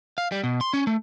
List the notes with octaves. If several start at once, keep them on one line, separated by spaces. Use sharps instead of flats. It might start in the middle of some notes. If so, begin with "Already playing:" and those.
F5
G3
B2
C6
C#4
A3